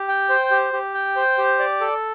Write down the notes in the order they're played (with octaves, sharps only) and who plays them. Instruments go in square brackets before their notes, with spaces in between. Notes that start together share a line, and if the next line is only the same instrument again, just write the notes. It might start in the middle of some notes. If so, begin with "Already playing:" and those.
Already playing: [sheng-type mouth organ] G4
G5
C5
G4
G4
G5
C5
G4
D5
A4